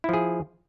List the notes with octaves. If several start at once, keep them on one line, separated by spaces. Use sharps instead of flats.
F3 E4 G#4